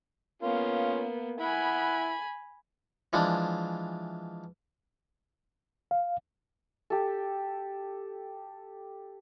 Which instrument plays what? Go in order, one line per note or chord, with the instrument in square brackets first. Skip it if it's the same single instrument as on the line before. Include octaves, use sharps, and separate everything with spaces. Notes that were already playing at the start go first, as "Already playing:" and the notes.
[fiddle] A#3 B3 [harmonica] C#4 F4
[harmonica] E4 F#5 [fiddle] G#5 B5
[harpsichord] E3 F3 G#3 D4
[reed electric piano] F5
[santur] G4 A4